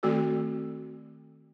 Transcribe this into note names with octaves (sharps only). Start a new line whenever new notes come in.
D#3 A3 C4 F#4 A4